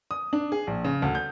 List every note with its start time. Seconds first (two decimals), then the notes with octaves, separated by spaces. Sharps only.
0.11 D#6
0.33 D4
0.52 G#4
0.67 A#1
0.84 C#3
1.02 D2
1.15 G6